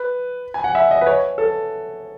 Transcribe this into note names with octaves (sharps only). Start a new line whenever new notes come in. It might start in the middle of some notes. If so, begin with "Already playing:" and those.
Already playing: B4
G#5
F#5
E5
D#5
B4
C#5
A4